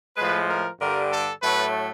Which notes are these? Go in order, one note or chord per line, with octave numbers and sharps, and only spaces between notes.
A2 F3 G#3 B4
A#4
G2 D3 G3 A#4
A4
A2 F#3 A3 B4